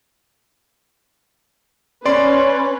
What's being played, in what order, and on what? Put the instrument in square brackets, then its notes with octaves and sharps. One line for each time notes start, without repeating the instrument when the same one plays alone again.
[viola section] C#4 B4 [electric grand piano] D5 C6